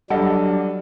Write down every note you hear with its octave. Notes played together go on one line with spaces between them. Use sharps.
F#3 G3 D4 A4 D#5 F#5